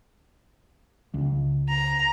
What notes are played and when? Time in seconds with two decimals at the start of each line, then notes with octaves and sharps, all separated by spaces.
1.14 C#2
1.69 A#5